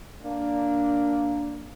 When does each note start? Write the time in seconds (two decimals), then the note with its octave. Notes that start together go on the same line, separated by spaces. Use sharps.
0.23 A#3 D4